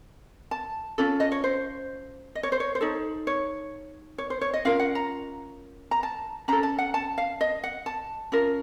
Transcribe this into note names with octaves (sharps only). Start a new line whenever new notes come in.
A5
C#4 F4 A4
D#5
C#5
C5
D#5
C#5
C5
C#5
C5
D#4 A4 C#5
C#5
C#5
C5
C#5
D#5
C#4 F4 A#4 F5
F#5
A#5
A#5
A5
C#4 A4 A#5
A5
F#5
A5
F5
D#5
F#5
A5
C#4 F4 A#4